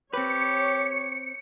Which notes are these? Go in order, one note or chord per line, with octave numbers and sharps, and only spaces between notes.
C4 G4 B4 C#5 C#7